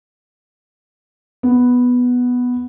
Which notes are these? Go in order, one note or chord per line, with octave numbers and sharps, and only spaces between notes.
B3